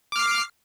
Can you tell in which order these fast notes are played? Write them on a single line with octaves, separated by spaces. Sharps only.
D6 F6 C7